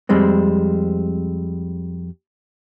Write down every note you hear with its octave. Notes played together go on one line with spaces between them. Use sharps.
F2 G3 G#3 C4